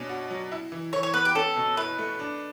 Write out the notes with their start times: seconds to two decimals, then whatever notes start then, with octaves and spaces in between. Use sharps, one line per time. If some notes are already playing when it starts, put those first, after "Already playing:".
Already playing: B2 C#4 D4
0.09 F#4
0.31 F#3
0.52 E4
0.72 E3
0.93 E3 C#5
1.03 C#5
1.14 B3 B4
1.25 G4
1.35 C#4 A4
1.57 B2
1.77 E4 B4
1.98 A3
2.19 D4